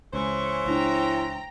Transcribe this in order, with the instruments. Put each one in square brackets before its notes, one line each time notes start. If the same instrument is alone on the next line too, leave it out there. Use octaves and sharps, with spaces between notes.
[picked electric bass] C#2 [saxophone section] E3 C5 C#5 [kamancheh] G#4 C#6
[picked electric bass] C#2 D4 [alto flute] E4 [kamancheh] G5 A#5